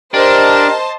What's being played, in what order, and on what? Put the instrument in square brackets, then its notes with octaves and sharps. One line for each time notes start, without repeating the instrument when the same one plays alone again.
[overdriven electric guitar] D4 [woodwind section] G4 A#4 [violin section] C5 D#5 A5